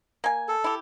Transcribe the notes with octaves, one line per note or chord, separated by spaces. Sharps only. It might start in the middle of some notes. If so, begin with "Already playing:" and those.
A#3 G#5
A4
E4 G4